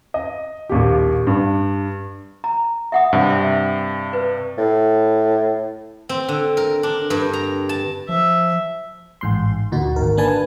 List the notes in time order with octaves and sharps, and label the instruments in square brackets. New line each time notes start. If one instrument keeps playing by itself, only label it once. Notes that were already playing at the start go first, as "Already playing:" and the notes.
[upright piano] D#5
A#1 D#2 G4
G2
[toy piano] A#5
E5 F#5 D#6
[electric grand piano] G2 C3
[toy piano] E5
B4
[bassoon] A2
[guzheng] C4
D3
A#4
D4
G2
A#5
A5
[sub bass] F3 [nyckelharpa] E5
[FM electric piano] A1 G#2 C6
D2 A#2 D#4 F#4
G#1 A#4
A#3 D4 B4 G#5 A5